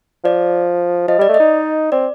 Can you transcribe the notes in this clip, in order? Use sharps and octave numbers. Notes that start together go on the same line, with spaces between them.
F3 D5
F3 D#5
G3 D5
A3
D#5
D#4
C4 D5